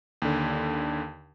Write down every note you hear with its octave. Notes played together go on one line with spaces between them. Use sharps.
D#2 D3